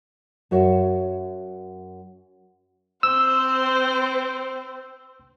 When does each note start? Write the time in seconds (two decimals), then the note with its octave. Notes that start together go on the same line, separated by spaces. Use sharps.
0.51 F#2 F#4 C#5 E5
3.03 C4 C5 E6